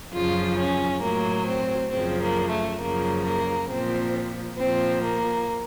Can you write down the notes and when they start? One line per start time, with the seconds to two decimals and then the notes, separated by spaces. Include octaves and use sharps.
0.13 F#2 C#3 F3 F4
0.58 C#4
1.02 A2 F#3 A#3
1.47 C4
1.91 F#2 C#3 F3 C4
2.22 A#3
2.51 A3
2.81 F#2 C#3 F3 A#3
3.25 A#3
3.69 A#2 F3 C4
4.58 A#2 F3 C4
5.04 A#3